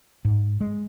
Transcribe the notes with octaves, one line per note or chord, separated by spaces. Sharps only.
G#2
G#3